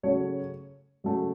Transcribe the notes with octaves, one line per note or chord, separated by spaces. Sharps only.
C#3 F#3 A3 C#5
C#3 F#3 A3